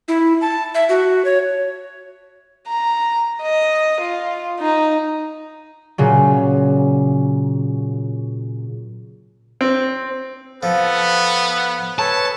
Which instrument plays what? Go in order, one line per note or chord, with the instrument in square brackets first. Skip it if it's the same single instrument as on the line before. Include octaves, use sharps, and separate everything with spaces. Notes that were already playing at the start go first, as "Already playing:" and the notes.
[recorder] E4
A5
E5
F#4
C#5
[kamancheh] A#5
D#5
F4
D#4
[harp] A#2 C#3 F#3
[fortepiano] C4
[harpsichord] F3 [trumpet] B3 [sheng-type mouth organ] A4
[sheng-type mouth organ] A4 B4 C#5 [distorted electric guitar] A5